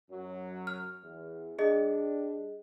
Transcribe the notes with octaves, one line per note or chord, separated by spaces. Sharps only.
F#2 F#3
F6
E2
G3 D4 G#4 D#5